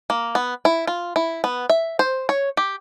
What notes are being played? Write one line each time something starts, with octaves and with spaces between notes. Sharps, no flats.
A#3
B3
E4
F4
E4
B3
E5
C5
C#5
G4